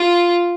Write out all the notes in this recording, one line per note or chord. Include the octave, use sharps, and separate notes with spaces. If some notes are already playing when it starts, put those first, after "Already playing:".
Already playing: F4